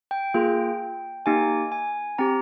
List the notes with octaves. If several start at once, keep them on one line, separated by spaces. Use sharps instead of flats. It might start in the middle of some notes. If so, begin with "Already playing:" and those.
G5
A#3 F4 G#4
A#3 D#4 G4 G#5
G#5
C4 G4 A#5